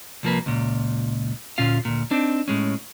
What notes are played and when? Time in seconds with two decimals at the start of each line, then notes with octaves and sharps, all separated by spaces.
0.23 C2 F3 A#3 B4
0.46 C#2 A#2
1.58 D2 A#2 C#4 F4 F5
1.85 D2 A#2
2.11 C4 D4 D#4
2.48 A2 G#3 C#4